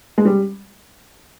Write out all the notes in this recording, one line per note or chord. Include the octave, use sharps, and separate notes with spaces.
G#3
G3